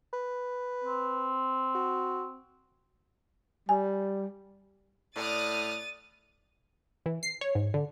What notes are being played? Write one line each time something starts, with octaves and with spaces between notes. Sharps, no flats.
B4
C4
F#4
G3 G#5
A2 D5 D#6 F6 F#6 A6 D#7
E3
C7
C#5
G#2
D3